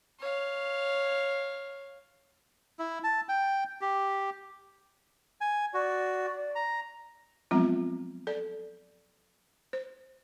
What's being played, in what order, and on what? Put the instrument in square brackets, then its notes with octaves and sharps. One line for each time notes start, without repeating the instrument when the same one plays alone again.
[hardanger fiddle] C#5 F5
[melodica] E4
A5
G5
G4
[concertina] G#5
[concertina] F#4 [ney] D5
[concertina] A#5
[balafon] F3 F#3 G#3 B3 C4 F4
A4 D5
C5